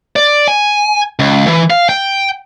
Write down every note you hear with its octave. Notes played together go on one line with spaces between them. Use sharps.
D5
G#5
C#2
E3
F5
G5